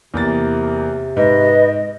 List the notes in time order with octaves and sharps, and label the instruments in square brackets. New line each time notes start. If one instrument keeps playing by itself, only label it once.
[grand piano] E2 A#3 A6 [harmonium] C3
[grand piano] G#2 [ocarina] B4 [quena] D#5